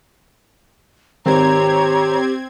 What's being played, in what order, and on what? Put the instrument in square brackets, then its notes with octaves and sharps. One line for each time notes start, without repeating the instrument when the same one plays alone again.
[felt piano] G#1 [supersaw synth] C4 G#6 [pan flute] G4 [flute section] C#5 A#5